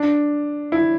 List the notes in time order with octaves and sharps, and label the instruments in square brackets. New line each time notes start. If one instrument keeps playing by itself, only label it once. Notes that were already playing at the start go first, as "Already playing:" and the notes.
Already playing: [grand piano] D4
E4